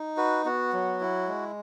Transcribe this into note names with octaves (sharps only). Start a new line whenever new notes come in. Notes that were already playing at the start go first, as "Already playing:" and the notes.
Already playing: D#4
F#4 B4
B3 F#4
F#3
E4
G#3